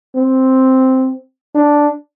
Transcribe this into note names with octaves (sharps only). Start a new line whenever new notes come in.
C4
D4